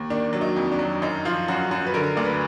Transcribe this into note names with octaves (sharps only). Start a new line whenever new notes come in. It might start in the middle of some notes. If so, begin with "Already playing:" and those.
Already playing: D#2
D#3 D4
F#3
D#4
F2
D4
F#3
F#2 D#4
F3 F4
F#2 F#4
F#2 F#4
B4
D3 A#4
D2 D5
B4